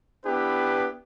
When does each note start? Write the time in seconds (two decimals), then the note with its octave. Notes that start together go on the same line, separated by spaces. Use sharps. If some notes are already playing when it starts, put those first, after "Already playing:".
0.25 B3 D4 E4 G4 B4